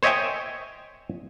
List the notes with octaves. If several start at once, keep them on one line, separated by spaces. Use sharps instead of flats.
C5 C#5 D#5 E5 G5 G#5